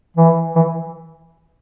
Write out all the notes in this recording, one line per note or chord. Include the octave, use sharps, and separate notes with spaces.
E3
E3